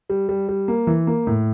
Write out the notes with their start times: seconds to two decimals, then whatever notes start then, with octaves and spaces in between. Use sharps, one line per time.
0.09 G3
0.29 G3
0.49 G3
0.68 A#3
0.87 E3
1.07 A#3
1.27 A2